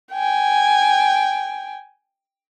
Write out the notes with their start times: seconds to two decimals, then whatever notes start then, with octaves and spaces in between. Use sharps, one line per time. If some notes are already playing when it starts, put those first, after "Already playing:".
0.13 G5 G#5